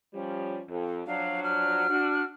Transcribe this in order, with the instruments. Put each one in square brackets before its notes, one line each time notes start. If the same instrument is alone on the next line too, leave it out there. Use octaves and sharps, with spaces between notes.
[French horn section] F3 G3 C#4
F2
[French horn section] F3 F#3 D4 [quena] F5
[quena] F6
[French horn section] D4 F#4